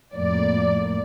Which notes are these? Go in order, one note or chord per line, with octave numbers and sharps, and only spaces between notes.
F2 A2 A#3 D5